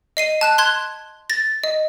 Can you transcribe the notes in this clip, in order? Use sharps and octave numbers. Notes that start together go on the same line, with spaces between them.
D#5 C7 D#7
A5 F#6 E7
C6 F#6 G#6
A6 A#6
D#5